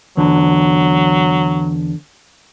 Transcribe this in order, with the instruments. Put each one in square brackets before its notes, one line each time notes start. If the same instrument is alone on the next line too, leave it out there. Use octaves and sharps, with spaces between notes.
[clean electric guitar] E2 D3 [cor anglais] F#3